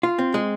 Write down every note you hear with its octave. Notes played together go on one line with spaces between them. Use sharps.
F4
C4
G#3